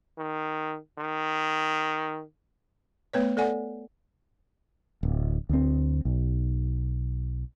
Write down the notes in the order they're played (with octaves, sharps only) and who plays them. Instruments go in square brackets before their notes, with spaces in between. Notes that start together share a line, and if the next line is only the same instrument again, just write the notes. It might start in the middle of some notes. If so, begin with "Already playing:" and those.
[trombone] D#3
D#3
[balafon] A3 B3 B4 C#5
A4 D5 F#5 G#5
[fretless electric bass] D1
D2 C4
B1